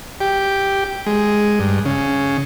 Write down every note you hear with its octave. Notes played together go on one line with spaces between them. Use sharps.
G4
G#3
G2
C#3